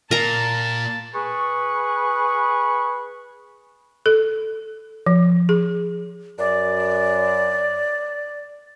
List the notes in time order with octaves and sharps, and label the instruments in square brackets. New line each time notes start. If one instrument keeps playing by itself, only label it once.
[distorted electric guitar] A#2 [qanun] A#4 A#5 [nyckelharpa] A5
[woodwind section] G#4 B4 C#6
[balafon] A4
F3
G#4
[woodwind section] F#2 [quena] D5